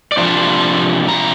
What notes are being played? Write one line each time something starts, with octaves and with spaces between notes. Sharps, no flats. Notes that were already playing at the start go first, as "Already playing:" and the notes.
D5
C3 F3 A#3 D4 C5
A#5